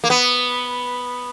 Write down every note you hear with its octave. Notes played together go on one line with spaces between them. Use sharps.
A#3
B3